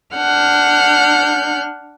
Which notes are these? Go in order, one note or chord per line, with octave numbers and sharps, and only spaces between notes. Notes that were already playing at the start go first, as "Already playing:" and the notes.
D4 F#5 F6 G6